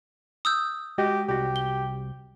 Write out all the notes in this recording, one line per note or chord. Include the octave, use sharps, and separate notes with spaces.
D#6 E6 G6
G#3 F#4 G4 D#5
C2 F#4 G4
G7